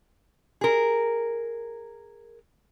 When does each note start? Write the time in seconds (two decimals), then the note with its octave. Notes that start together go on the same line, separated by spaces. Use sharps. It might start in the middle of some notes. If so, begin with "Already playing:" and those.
0.61 G#4 A#4